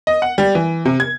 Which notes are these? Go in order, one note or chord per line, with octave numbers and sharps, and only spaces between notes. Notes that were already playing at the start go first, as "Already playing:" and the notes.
D#5
F#5
G3
E3
C3
G#6